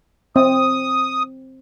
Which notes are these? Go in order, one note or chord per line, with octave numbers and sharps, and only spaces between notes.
C4 D#6